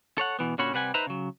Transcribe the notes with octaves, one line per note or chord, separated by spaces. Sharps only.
A4 C#5 F#5
B2 E3 B3
A#2 D3 C#4 F#4 C#5 B5
C3 G3 B4 F#5 G#5
D#4 B4 C5 E5 A#5 B5
C#3 F#3